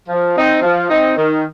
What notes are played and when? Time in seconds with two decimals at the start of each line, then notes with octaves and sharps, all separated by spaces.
0.08 F3
0.35 C4 D#4
0.62 F3
0.89 C4 D#4
1.17 D#3